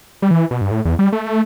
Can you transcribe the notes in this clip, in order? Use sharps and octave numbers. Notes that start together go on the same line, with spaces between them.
G3
E3
B2
G2
A2
E2
G3
A3